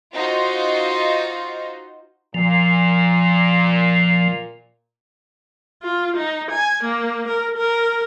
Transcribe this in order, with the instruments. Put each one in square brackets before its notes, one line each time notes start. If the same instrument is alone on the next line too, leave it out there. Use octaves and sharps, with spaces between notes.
[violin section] D#4 F4 F#4 C5
[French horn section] A#2 [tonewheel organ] F3
[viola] F4
D#4
G#5
A#3
A#4
A#4